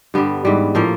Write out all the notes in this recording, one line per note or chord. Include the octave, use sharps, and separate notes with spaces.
G2 D3 G3 B3
G#2 E3 G3
A2 F3 A#3